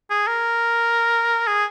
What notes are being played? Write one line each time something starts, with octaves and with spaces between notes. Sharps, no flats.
G#4
A#4
G#4